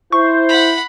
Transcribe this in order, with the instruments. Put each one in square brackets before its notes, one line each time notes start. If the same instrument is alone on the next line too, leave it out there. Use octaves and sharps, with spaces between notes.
[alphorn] E4 [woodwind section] C5 [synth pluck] C#6
[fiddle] F#5 B5